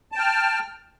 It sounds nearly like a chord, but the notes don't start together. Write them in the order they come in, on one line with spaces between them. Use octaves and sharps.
A5 G5 F6